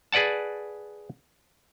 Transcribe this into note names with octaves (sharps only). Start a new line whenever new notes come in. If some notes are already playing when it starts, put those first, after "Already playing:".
G#4 B4 D5 F#5 A5